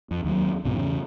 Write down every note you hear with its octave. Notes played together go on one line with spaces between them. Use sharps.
F2
D#2 F#3
C2 G#2 B2 B3
E2 C#3